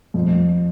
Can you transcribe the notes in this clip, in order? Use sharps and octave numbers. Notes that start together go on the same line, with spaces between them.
F2